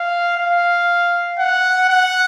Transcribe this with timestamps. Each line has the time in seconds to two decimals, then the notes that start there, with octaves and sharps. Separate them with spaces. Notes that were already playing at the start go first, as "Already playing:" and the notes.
Already playing: F5
0.37 F5
1.39 F#5
1.89 F#5